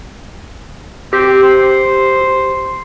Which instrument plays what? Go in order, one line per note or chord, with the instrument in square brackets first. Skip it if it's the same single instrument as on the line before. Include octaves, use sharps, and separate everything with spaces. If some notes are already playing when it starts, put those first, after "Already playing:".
[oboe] C4 [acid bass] G4
[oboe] C5